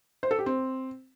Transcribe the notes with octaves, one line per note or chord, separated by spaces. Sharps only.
C5
A4
G4
C4